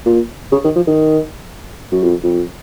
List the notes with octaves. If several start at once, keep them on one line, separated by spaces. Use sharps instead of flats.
A#2
C#3
D#3
F3
D#3
F#2
F2
F2